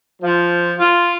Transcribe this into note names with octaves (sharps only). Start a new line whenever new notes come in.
F3
F4